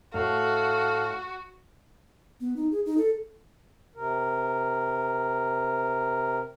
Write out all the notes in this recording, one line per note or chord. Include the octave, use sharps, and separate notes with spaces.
A2 F#4 A4 E5 F5
B3
D#4
G#4
D#4
A4
C3 A#4